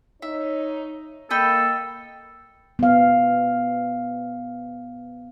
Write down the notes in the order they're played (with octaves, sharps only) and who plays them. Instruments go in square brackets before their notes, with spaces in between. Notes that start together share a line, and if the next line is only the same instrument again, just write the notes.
[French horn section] D#4 C#5 [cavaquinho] E5
[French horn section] A#3 [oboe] A4 [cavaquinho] D#5 G5 B5
[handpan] B3 F5